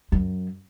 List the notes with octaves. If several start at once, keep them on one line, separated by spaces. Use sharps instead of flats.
F#2